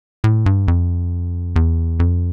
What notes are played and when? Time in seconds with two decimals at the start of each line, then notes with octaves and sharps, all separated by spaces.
0.24 A2
0.46 G2
0.68 F2
1.56 E2
2.00 F2